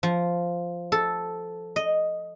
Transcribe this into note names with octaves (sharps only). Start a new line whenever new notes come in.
F3
A4
D#5